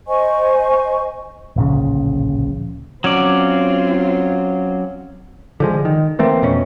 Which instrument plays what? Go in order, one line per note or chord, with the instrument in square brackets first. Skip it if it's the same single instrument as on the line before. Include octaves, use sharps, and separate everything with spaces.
[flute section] C5 D#5 G#5 C#6
[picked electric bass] D1 A#1 C#3
[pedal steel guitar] F#3 C#4 D5 [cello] C4 F4
[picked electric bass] D3 F3 G#3
D#3
E3 A3 A#3 C4
F2 B2 C#4